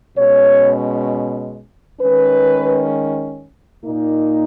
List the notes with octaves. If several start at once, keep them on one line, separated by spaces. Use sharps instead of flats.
B2 G#3 C#4 C#5
D#3 G#3 C#4 B4
A#2 A#3 D#4